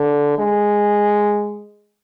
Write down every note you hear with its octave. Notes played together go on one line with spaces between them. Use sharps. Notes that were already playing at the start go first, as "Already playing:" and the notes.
Already playing: D3
G#3